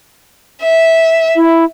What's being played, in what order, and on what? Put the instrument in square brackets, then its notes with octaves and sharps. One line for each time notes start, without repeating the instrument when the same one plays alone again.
[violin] E5
[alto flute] E4